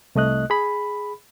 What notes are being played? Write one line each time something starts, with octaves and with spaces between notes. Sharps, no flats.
C2 A3 D#5 F#6
G#4 B5